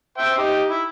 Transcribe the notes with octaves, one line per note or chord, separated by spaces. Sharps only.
C5 E5 G5
D#4 G4
E4